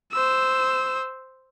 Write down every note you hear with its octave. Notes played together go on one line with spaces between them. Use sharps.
C5 E6